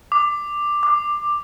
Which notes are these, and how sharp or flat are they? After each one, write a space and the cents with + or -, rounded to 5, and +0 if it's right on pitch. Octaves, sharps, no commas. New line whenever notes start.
D6 +10
D6 +15